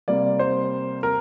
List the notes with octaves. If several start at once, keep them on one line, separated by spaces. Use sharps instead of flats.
C3 G3 A#3 D5
C5
A#4